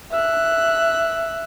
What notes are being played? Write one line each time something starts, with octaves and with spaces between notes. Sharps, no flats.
E5 F#6